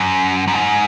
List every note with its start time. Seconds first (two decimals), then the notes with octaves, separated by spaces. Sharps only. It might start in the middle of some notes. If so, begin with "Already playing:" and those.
Already playing: F#2
0.48 F#2
0.53 G#2